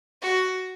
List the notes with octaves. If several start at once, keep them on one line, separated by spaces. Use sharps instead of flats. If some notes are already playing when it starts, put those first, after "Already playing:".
F#4